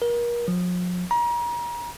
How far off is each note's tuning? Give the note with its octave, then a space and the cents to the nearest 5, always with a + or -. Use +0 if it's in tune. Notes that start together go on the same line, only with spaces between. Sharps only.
A#4 +35
F3 +45
A#5 +35